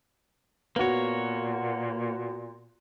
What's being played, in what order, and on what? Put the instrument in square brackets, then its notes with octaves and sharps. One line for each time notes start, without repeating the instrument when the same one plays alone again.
[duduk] A#2 [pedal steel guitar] A#3 C#5 [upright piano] B3 F#4